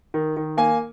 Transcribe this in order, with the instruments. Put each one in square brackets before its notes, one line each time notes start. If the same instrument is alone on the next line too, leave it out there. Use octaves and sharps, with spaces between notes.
[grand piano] D#3
D#3
A#3 G#5